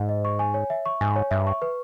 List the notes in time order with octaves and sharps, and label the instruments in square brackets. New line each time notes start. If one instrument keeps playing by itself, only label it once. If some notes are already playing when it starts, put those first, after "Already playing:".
Already playing: [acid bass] G#2
[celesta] D#5
C#6
G#5
C#5
E5
C#6
[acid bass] G#2 [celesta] G#5
[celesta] C#5
[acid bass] G2 [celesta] E5
[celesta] C#6
B4